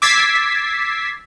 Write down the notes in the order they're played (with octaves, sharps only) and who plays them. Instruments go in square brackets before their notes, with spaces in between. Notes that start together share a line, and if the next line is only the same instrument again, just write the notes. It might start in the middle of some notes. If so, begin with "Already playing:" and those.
[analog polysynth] D6 E6 G#6 A6 B6 C7